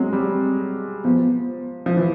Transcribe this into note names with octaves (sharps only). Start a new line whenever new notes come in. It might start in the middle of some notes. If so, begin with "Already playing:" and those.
Already playing: F#3 G#3 C4
G3
F3 B3
F3
E3